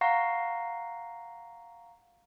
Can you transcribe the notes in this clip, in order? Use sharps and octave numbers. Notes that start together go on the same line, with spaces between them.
F5 F#5 A#5 C#6 A#6 C7